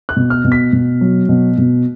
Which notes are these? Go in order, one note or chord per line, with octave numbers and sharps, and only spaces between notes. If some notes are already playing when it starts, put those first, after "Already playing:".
F#6
B2
F6
B2
B6
B2
F#3
B2
B2